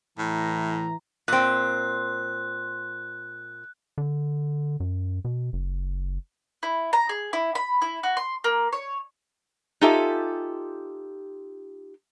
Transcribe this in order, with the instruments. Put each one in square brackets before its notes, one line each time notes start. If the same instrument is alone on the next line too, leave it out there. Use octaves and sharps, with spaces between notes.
[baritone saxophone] A2 [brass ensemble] E3 A#5
[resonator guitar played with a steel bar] A#2 C4 [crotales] F#6
[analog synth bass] D3
F#2
B2
F#1
[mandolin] E4
A#5
G#4
E4
B5
E4
F#4
C6
A#3
C#5
[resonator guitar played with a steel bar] D#4 F4 G4 A4 E5 G#5